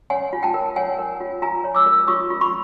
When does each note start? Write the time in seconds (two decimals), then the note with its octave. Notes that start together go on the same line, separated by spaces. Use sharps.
0.10 C#5 F#5 G#5
0.33 F4
0.43 G5 A5
0.54 A#4
0.76 C#5 F#5 G#5
0.99 A#4
1.20 F4
1.42 F4 G#5 A#5
1.64 C#5
1.75 D6 E6
1.86 A#4
2.08 F4 C#6 D#6
2.30 F4
2.41 B5 C#6